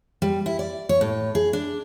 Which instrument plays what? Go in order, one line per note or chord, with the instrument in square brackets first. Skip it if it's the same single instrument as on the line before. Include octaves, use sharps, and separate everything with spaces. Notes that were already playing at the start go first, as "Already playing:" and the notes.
[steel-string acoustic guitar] G3
E4
D5
C#5
A2
G#4
D4